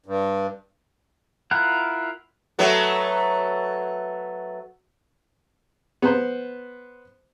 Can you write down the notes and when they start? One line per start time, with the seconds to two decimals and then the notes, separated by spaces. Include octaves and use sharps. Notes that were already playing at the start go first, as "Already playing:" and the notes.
0.06 G2
1.51 E4 F4 A#4 F#5
2.59 F#3 A3 B3
6.02 B3 C5